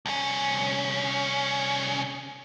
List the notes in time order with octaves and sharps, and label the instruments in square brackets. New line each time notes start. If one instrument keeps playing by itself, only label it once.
[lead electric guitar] C2 C#4